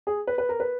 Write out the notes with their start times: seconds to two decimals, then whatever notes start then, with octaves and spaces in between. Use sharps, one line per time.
0.07 G#4
0.27 B4
0.38 B4
0.49 A#4
0.60 B4